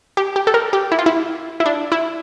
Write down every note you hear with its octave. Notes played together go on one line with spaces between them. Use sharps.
G4
G4
A4
A#4
G4
E4
F4
E4
E4
D4
E4